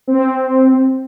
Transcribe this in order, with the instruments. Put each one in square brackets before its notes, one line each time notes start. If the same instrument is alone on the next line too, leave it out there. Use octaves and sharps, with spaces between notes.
[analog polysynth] C4